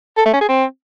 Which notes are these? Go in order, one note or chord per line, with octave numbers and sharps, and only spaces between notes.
A4
A3
C#4
G#4
C4